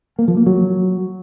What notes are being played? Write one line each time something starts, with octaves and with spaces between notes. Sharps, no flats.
A#3
F3
A#3
F#3